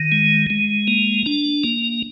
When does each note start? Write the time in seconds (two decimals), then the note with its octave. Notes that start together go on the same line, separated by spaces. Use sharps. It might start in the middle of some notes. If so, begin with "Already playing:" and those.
Already playing: D#3
0.12 G#3
0.50 G#3
0.88 A#3
1.26 D4
1.64 A#3